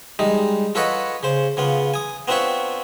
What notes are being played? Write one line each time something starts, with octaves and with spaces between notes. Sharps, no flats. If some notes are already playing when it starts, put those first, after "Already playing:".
G3 G#3 D#4
F4 A4 B4 C#5 D#5 F#5
C#3 C5
C#3 B3 F4
G#5 D#6
B3 C4 D4 F4 B4 C#5